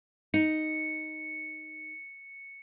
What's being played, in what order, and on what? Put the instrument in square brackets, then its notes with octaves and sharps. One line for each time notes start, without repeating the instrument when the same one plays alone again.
[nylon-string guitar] D#4 [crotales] C#7